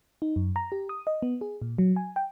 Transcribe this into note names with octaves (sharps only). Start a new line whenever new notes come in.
D#4
F#2
A#5
G4
D#6
D#5
B3
G#4
A#2
F#3
G#5
G5